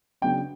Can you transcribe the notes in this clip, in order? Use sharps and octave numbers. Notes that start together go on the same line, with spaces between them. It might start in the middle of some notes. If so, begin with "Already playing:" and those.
C#3 F#3 B3 D4 G5